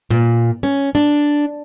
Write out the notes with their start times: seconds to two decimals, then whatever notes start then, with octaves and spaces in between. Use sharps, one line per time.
0.10 A#2
0.63 C#4
0.95 D4